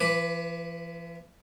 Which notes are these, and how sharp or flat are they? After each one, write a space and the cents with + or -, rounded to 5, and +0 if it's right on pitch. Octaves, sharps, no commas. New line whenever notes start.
E3 +45 B4 +0 D6 +0